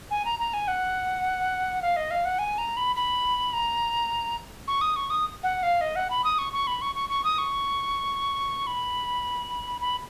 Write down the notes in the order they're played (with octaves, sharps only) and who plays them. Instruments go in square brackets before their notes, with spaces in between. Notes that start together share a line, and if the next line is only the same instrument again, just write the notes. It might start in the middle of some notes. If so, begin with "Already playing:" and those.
[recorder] G#5
A#5
A#5
G#5
F#5
F5
D#5
F5
F#5
G#5
A#5
B5
B5
A#5
C#6
D#6
C#6
D#6
F#5
F5
D#5
F#5
B5
D#6
C#6
C#6
B5
C#6
C#6
C#6
D#6
C#6
B5
B5